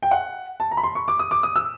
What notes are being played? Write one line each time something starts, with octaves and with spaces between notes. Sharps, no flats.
G5
F#5
A5
A#5
B5
C6
C#6
D6
D#6
D6
D#6
E6